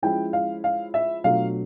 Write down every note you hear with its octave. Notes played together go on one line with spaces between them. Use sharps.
F3 G#3 C#4 E4 G5
F5
F5
E5
B2 F#3 A3 D4 F4 F5